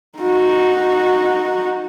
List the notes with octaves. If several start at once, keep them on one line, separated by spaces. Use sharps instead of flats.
D#4 F#4